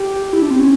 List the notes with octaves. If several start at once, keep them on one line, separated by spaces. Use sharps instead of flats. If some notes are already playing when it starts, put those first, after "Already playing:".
Already playing: G4
E4
D4
C4
C#4